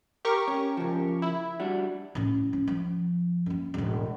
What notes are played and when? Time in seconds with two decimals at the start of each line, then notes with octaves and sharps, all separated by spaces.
0.25 G4 A#4 C#6
0.48 C#4
0.77 C#3 F3
1.22 E4
1.60 G3 D4 F#4
2.15 A2 C#4
2.53 C#4
2.67 F3
3.46 F#2 A#3
3.74 E1 A2